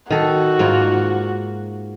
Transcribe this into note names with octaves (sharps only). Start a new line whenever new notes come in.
D#3 F#4 A4
G#2 A#3 F4